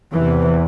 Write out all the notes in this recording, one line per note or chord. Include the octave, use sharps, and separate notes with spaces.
E2 C3 E3